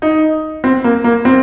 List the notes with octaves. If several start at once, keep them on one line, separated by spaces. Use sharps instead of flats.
D#4
C4
A#3
A#3
C4